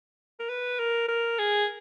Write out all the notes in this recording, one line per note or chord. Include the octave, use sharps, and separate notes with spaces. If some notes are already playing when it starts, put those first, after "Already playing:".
A#4
B4
A#4
A#4
G#4